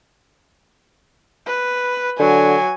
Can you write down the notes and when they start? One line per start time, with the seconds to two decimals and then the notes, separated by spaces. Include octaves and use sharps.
1.46 B4
2.20 D3 F#3 G#5